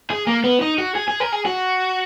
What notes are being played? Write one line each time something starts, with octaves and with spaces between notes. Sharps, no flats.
G#4
A#3
B3
D#4
F#4
G#4
G#4
A#4
G#4
F#4